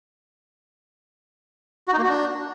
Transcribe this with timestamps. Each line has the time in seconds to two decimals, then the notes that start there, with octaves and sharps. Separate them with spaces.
1.88 F#4
1.93 D#4
1.98 A#3
2.04 F#4
2.09 D4